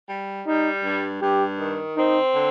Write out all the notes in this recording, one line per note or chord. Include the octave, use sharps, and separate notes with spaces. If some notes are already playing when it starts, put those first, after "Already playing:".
G3
G3 D#4
G2
G2 G4
D#3
C4 D#4
D3